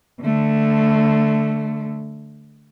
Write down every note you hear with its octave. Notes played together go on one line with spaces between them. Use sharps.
D3 A3